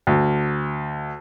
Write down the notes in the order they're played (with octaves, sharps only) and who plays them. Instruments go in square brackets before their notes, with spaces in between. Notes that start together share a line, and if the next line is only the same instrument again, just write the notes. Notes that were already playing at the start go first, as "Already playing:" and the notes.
[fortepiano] D2